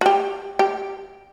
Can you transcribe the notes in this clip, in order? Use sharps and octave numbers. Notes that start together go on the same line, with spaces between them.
F#4
G4
G4